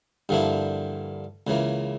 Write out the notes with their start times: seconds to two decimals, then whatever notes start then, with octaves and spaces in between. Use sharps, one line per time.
0.29 G2 D3 F3 A#3 E4
1.47 C#2 C#3 E3 A#3